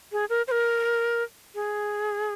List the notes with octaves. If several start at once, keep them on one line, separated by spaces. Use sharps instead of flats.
G#4
A#4
C5
A#4
G#4